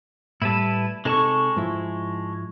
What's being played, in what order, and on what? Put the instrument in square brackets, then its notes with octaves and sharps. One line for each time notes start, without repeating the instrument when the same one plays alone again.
[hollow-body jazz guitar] A2 G3 [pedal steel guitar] E4 B4 A5
[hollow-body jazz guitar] C3 D#4 A4 [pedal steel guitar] G#3 A5 C#6
[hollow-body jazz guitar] G#2 F3 E4